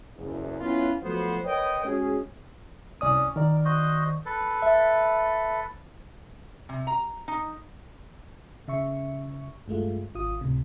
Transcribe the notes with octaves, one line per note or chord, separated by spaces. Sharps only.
F#1 E2
B3 C#4 E4 F4 B4
F3 F#3 A3 B3 F#4 C5
A#4 B4 C#5 D#5 G5
G#3 C#4 F#4 G#4
C2 C#4 D5 D#6
D#3 A#4 D5
F#4 C5 D#5
A4 B4
E5
C3
A#5
D#4
C#3 E5 C#6
G2 G#3 A3 F4
G#1 F4 D#6
C#2 A2 C3